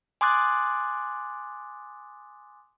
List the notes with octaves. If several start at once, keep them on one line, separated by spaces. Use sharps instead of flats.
G#5 C6 D6 D#6 F#6 A6